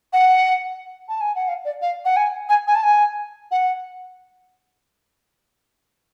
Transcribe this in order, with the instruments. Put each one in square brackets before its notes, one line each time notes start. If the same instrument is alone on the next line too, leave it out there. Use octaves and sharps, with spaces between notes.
[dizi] F#5
A5
G#5
F#5
F5
D5
F5
F#5
G#5
G#5
G#5
A5
G#5
F#5